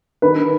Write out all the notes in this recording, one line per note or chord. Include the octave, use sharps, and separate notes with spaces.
D#3 B4